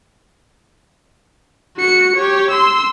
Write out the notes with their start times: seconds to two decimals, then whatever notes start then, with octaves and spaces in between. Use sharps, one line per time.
1.77 F#4 C#7
2.16 G4 C#5
2.50 C6 E6